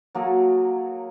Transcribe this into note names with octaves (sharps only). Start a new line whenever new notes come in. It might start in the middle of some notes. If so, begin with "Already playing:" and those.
F#3 A#3 G#4 A4